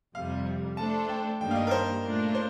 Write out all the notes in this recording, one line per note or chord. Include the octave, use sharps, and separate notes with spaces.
F2 C3 G3 F5
A3 D4 A4 C5 A5
G5
G2 D#3 G3 A#3 D4 G5
F5
D#5
A#4
C5
A#2 A3 D4 F4 A#4
C5